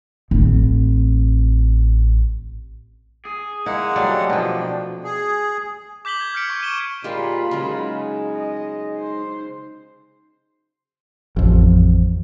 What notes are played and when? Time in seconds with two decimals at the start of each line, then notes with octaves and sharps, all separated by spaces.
0.31 A1 C4
3.25 G#4
3.66 G#3 A#3 D#4 E4 F#5
3.96 F#3 G3 A3 D4 D#4
4.30 B2 F3 G5
5.04 G#4
6.05 D6 G6 B6 F#7 G7
6.21 G#6
6.34 F6 G6 G#6 B6 C#7 D7
6.50 C#6
6.62 D#7 E7 G7
7.04 A#2 G#3 A#3 F4 G4 B5
7.51 C#3 F#3 G#3 D#4
8.35 D#5
8.97 C5
11.36 A1 F2